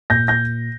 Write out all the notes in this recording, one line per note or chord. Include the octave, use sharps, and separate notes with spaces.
A#2 G6 A#6
G6 A#6